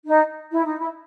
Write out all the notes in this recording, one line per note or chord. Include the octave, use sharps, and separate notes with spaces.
D#4
E4
D#4
E4